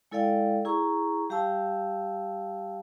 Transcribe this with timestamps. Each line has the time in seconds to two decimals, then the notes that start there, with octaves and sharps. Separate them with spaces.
0.11 G#3 E4 A4 D5 F5 G5
0.65 E4 G#4 A#5 C#6
1.30 G3 G4 F5 G5 A5 E6